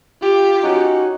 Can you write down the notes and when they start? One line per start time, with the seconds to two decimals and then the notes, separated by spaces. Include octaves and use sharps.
0.21 F4 G4
0.63 C#4 D#4 F#4